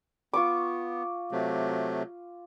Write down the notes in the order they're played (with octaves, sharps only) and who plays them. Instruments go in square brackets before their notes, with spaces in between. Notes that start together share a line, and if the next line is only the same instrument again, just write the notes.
[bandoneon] B3 [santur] F4 C#6 D6
[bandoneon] C3 F#3 A3